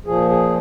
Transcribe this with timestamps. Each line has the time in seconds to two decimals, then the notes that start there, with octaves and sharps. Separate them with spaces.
0.06 A#2 F3 G#4
0.30 G#4